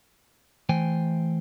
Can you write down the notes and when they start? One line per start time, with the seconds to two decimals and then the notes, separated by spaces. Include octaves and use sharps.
0.69 E3 A3 C5 G5 G#5